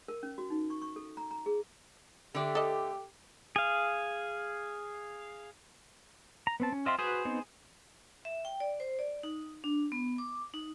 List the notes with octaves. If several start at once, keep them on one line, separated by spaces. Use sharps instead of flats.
A#4
C#4
F#4
D#4
C#6
C#6
A4
A#5
A#5
G#4
D3 A3 G4 D5
A4 D#5
G#4 F5
A#5
B3 C4 A5
C#4
C4 F4 D#5 E5 C6
F#4 G#4 B4 C5
B3 C4 D#4
E5
G5
D5
C5
D5
D#4
D4
B3
D6
D#4